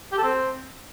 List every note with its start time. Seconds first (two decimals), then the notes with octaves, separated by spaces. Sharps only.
0.12 G4
0.18 A4
0.23 C4